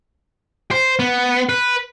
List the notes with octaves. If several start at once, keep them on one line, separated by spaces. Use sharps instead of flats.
C5
B3
B4